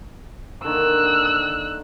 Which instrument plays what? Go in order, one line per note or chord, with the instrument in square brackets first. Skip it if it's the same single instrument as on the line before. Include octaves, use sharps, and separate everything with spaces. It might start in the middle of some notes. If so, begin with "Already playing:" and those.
[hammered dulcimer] D3 D#3 A#3 [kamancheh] E6 F#6